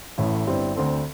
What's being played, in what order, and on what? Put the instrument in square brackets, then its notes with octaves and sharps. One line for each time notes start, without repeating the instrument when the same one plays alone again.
[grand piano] A1 A2 A3 E4
G1 G2 G3 C4 E4
D2 D3 C4 A4